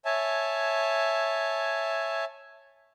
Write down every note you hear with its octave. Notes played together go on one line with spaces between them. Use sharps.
C#5 E5 G#5 A5